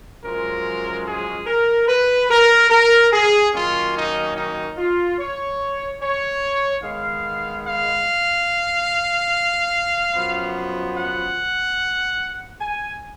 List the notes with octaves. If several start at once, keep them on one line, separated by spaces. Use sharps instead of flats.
F#2 F3 G#3 C#4 A#4
G#4
A#4
B4
A#4
A#4
G#4
F#2 D#3 A#3 C#4 F4
D#4
D#4
F4
C#5
C#5
D#3 G#3 B3 F5
F5
F#2 F3 B3
F#5
G#5